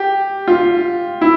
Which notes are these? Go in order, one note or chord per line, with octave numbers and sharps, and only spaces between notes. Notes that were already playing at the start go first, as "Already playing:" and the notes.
Already playing: G4
F4
E4